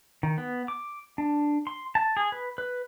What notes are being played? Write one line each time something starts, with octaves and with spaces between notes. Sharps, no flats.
D#3
B3
D6
D4
C6
A5
G#4
B4
B4